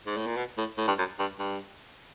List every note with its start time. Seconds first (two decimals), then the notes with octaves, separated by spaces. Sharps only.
0.06 G#2
0.17 A2
0.26 A#2
0.37 B2
0.57 A2
0.78 A2
0.87 G2
0.98 F#2
1.19 G2
1.39 G2